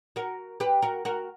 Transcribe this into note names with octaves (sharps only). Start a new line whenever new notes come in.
F#4 A#4
G4 B4
F#4 A#4
F#4 A#4